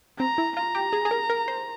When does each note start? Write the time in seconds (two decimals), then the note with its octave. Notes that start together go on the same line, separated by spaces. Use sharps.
0.19 C4 A#5
0.38 E4
0.56 F4 A#5
0.75 G4
0.93 G#4
1.05 G#4
1.11 A#4
1.30 A#4
1.48 C5